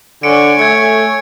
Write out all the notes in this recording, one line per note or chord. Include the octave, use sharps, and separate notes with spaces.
D3 C#5 G#5 C#7 D7
A3 G#6 C#7